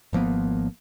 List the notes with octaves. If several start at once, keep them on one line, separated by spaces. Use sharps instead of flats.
G#1 F3 A#3 B3